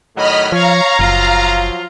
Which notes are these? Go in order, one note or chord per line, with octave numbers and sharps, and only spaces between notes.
A2 D#3 F#3 D#5 B5 F6
F3 C#5 F5 A#5
F#1 F3 F#3 F4